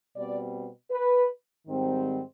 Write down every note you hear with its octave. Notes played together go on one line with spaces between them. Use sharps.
B2 G3 C4 D5
B4
G#2 D#3 G3 C4